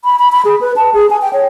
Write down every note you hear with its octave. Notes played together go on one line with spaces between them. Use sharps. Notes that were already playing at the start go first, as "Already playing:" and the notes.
B5
B5
B5
G#4
B4
A5
G#4
G#5
G5
C#5